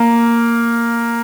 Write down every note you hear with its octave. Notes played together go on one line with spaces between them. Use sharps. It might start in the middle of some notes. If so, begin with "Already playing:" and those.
Already playing: A#3